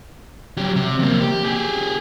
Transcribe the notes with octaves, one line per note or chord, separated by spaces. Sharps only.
F#3 G4
C3
F2 A#3
G4
G4 G#4